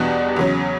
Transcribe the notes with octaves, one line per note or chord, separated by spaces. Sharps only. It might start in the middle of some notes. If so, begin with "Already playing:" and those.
Already playing: E2 B2 G3 D4 F#4
E2 C#3 F#3